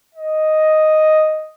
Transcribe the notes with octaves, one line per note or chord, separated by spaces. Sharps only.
D#5